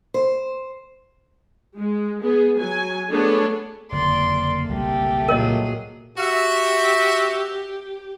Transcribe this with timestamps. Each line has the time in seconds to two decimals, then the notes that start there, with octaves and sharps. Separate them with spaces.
0.14 C5
1.77 G#3
2.22 B3 G#4
2.58 F#3 G#5
3.10 A3 B3 D4 G#4 A4 C#5
3.92 F#1 F2 D3 A#3 D5 C6
4.69 F#1 C2 B2 A3 G4
5.29 A#2 F#3 G#4 A#4 C#5 D#5
6.18 F#4 G4 E5